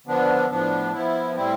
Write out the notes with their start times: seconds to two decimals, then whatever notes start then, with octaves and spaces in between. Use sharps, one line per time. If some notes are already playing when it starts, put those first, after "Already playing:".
0.06 D3 F3 B3 D4
0.50 A2 F3 B3 D4
0.93 F3 B3 E4
1.36 A2 G3 C4 E4